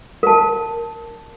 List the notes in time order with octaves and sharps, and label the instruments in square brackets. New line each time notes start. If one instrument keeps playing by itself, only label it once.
[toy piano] A#4 A5